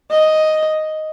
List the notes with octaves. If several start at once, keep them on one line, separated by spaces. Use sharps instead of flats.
D#5